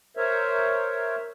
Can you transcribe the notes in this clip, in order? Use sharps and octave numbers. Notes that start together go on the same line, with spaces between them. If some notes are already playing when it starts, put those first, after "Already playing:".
A#4 C5 C#5 E5